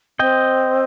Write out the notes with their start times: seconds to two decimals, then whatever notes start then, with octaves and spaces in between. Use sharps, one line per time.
0.19 C4 D#5 G5